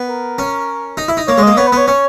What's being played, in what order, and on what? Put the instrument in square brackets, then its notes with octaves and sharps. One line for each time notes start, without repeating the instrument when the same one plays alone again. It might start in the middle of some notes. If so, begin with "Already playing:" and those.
Already playing: [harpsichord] B3
[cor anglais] A#4
[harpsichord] C#4
D#4
E4
D#4
[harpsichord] A#3 [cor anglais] C#5
[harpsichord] G#3
[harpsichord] A#3 [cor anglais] D#5
[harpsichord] B3 [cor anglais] C#5
[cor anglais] B4
[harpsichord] B3 [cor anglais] C#5
[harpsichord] C#4 [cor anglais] C#5